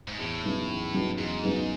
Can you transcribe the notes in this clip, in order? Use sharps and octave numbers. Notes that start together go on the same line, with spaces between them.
G#2
E2 A2
C#3 F#3 B3 D#4
E2
C#3 F#3 B3 D#4
E2 G#2
C#3 F#3 B3 D#4